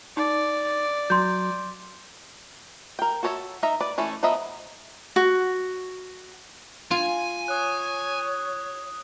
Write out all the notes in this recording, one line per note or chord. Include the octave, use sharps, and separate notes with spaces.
D#4 D5
F#3 C6 G6
A#4 G5
F#4 A4 C#5 D#5 E5
D#4 A#4 E5 A#5
B4 D5
E3 A3 C#4
F3 B3 A#4 D#5 E5
F#4
F4 G#5
C#5 D#6 F#6